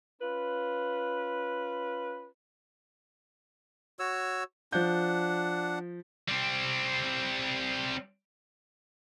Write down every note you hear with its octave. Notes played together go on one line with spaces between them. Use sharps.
C#4 F4 B4
F#4 C#5 E6
F3 D4 F#5 G6
G3 C4